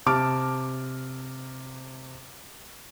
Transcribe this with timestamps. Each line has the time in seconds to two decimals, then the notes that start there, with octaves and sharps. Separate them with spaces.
0.06 C3 A5 D6 F6 D7